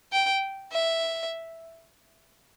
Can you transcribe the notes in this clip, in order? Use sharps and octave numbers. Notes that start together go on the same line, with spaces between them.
G5
E5